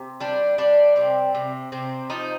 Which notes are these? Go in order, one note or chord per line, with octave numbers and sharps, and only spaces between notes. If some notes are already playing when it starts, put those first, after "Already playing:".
Already playing: C3
G3 D4
G3 D4
C3 C4
C3
C3 C4
F3 D#4